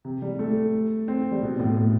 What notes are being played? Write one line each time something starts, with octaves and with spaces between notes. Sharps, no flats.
C3
G3
A3
C4
G3
B2
A2
A2